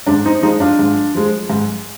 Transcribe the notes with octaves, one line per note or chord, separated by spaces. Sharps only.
G#2 D4
C4 D#4
F3 G#3 C4 D#4
D4 F4
G#2
F3 G#3
G#2